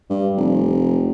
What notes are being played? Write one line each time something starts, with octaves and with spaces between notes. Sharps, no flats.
G2
F1